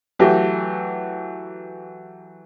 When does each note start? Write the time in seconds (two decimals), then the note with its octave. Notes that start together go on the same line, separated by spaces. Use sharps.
0.19 E3 F#3 A3 G4